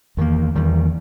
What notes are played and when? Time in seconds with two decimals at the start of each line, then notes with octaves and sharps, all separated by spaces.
0.17 E2 D#3 A#3
0.55 E2 D#3 G3